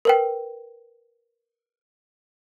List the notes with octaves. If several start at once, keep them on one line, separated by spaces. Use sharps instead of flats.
A#4 B4 G5